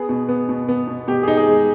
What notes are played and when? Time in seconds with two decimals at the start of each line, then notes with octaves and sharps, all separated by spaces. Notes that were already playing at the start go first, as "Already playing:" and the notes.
Already playing: B3 G#4
0.09 B2
0.29 B3
0.49 B2
0.69 B3
0.87 B2
1.07 B2 G4
1.23 D#4 G#4
1.37 G#4
1.47 G#3